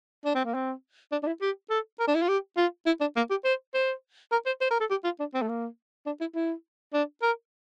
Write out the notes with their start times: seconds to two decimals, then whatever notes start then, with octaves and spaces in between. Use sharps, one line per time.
0.25 D4
0.35 C4
0.45 A#3
0.54 C4
1.12 D4
1.23 D4
1.27 E4
1.41 G4
1.70 A4
1.99 A#4
2.07 D4
2.15 E4
2.22 F4
2.29 G4
2.57 F4
2.86 E4
3.01 D4
3.16 A#3
3.30 G4
3.44 C5
3.74 C5
4.32 A#4
4.46 C5
4.61 C5
4.71 A#4
4.80 A4
4.90 G4
5.04 F4
5.20 D4
5.34 C4
5.42 A3
5.49 A#3
6.06 D4
6.20 E4
6.35 E4
6.93 D4
7.22 A#4